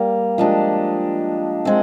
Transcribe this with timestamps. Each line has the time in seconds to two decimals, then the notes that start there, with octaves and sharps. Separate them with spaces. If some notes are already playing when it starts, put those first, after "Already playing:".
Already playing: G3 A#3
0.38 F3 G#3 D4 G4
1.65 G#3 C4